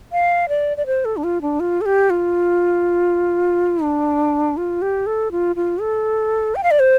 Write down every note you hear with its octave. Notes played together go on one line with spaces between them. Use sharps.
F5
D5
D5
C5
A4
D4
F4
D4
F4
A4
G4
F4
D4
F4
G4
A4
F4
F4
A4
G5
F5
D5
C5